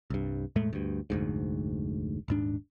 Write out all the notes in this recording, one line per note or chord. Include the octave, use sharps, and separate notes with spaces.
C2 G2
E1 A2 G#3 A3
D2 G2
F1 D2 G#2
D#1 G#2 D4